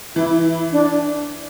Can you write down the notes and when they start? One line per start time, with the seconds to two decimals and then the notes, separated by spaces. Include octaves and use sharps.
0.16 E3 E4
0.45 E4
0.72 D4